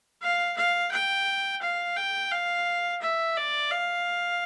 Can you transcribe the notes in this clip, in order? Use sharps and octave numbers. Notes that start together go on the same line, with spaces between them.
F5
F5
G5
F5
G5
F5
E5
D5
F5